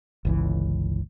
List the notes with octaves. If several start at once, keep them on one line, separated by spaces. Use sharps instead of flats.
G1 C#2 E3